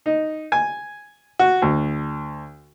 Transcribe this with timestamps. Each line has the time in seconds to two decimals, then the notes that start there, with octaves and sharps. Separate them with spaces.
0.06 D#4
0.52 G#5
1.39 F#4
1.62 D2